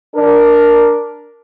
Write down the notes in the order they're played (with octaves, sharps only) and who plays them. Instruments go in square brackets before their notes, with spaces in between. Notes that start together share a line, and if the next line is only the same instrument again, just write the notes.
[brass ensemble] D4 A#4